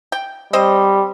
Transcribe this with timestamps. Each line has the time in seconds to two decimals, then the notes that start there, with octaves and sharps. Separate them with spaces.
0.12 G5
0.53 G3 C4 C5 D#5